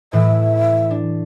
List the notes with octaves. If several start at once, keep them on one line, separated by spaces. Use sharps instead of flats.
A2 E3 A3 E5
D4